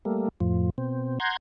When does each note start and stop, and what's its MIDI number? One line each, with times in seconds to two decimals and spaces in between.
0.05 0.29 55
0.05 0.29 57
0.05 0.29 58
0.40 0.70 41
0.40 0.70 45
0.40 0.70 53
0.78 1.19 47
0.78 1.19 60
1.20 1.37 78
1.20 1.37 82
1.20 1.37 84
1.20 1.37 91
1.20 1.37 92